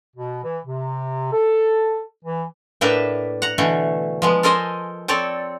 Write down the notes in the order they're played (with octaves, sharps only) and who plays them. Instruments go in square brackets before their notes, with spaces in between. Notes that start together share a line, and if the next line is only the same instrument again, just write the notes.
[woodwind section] B2
E3
C3
A4
E3
[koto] A2 A#3 D4 A#4 B4 E5
F#5 A#5
B2 D3 E3 A3
F3 G#3 B3
A4 A#4 C5 D#5 G#5
C4 A4 C#5 D5